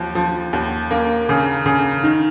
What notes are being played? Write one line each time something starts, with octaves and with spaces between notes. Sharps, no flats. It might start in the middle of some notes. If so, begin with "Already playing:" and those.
Already playing: D#2 F3
F3
D#2
A#3
C#3
C#3
D#3